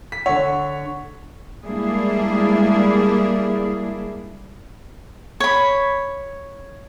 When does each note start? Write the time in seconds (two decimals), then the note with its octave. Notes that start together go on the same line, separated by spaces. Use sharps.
0.12 B6
0.26 D3 C#5 F#5
1.65 G3 G#3 A#3 D4 E4 G#4
5.40 C#5 B5